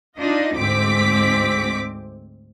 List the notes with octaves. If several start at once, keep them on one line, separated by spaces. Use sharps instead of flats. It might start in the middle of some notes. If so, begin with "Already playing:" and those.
D4 D#4 F4 D#5
D2 G#2 C4 D6 B6